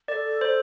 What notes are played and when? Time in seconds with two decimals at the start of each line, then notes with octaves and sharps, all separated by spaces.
0.08 A#4 D5
0.12 A4
0.41 C5